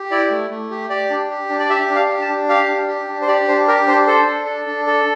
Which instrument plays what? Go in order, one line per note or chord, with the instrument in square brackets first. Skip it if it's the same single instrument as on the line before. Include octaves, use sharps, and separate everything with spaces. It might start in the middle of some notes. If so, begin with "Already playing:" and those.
Already playing: [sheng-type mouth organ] G4
E4 D5
A3
A3
G4
G4 D5
D4
G4
D4
D5
G4 E5
D4
F5
G4
A5
D4
G4 F5
D4
G4
D4
C5
G4 D5
D4 C5
G4 A#4
D4 C5
A4 C5
D4
A4
D4
A4